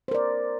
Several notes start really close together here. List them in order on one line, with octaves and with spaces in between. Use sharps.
C5 A#4 D5